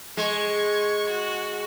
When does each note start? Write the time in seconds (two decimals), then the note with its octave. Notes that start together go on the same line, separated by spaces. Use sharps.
0.17 G#3 C#6 G#6
1.10 F#4